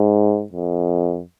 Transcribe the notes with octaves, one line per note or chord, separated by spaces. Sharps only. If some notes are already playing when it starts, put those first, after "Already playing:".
Already playing: G#2
F2